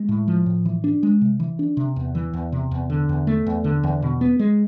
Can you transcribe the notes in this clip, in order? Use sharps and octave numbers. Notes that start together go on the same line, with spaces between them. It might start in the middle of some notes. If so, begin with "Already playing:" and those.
Already playing: G#3
A2
F3
A2
E3
D4
G#3
C3
E3
D4
C3
E2
E3
E2
C3
E2
D3
E2
A3
E2
D3
E2
B2
B3
G#3